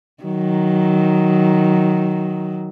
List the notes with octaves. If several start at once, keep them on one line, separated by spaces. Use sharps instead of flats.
D#3 F#3